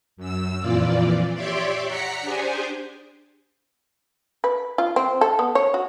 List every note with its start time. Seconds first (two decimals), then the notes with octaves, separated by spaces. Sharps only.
0.17 F#2 E6
0.60 F2 A#2 E3 F3 F4 D5
1.35 G4 C#5 D5 E5 C6 D6
1.87 F#5 A#5 B6 C#7
2.22 D4 G4 G#4 C5 G#5
4.44 B4
4.78 F4
4.96 C4
5.21 A4
5.39 B3
5.55 C#5
5.74 F#4